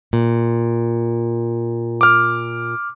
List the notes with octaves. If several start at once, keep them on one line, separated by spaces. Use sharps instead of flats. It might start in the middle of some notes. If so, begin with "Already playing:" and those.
A#2
D6 F6